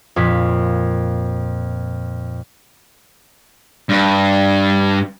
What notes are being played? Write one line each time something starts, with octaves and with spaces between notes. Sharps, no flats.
F2 A#2 B6
G2